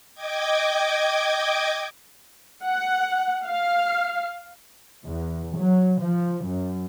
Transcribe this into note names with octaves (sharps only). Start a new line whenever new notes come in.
D#5 G5 D6 G#6
F#5
F5
E2
F#3
F3
F#2